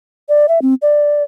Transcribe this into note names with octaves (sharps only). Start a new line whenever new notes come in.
D5
E5
C4
D5